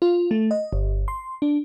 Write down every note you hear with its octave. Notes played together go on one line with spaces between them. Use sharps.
F4
A3
D#5
G1
C6
D4